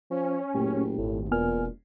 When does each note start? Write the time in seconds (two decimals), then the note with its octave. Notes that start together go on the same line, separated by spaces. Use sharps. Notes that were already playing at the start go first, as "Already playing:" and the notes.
0.11 F3 C#4
0.55 F#1 A#2 A3 G4
0.98 G#1 A2
1.31 E1 A#2 B3 G#5 F6